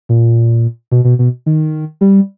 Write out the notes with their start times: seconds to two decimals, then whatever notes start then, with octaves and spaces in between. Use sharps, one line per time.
0.09 A#2
0.92 B2
1.05 B2
1.19 B2
1.46 D#3
2.01 G3